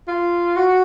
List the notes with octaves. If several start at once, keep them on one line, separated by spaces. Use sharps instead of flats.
F4
F#4